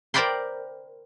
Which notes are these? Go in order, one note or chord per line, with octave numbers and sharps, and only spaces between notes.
A#4 C5 D5 G5 B5 C6